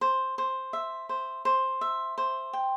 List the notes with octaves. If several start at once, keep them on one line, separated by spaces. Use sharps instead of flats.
C5
C5
E5
C5
C5
E5
C5
G5